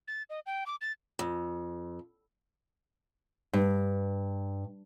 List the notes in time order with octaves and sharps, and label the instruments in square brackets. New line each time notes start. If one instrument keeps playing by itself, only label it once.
[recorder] A6
D#5
G5
D6
A6
[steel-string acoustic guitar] F2
G2